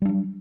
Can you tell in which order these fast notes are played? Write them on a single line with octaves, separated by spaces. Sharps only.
G3 D4 F#3